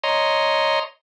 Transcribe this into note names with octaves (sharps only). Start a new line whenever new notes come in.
C#5 D#5 A#5 C6